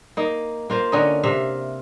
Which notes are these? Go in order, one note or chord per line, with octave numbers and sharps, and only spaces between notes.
A#3 D#4
A#3 F4 C5
D3 C#4 D#4 D#5
C3 E5 F5